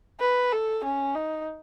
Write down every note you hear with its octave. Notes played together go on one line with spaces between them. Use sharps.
B4
A4
C#4
D#4